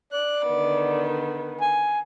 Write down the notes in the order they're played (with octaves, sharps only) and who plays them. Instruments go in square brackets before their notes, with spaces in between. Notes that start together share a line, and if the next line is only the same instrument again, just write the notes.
[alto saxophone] D5 [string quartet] F#6
[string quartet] D3 D#3 B3
[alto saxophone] G#5